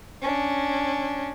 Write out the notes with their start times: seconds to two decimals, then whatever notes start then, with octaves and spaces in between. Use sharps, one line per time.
0.22 C#4 D4